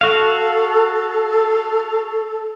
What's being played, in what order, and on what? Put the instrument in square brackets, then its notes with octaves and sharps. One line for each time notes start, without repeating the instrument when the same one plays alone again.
[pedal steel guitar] F#4 F5 [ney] A4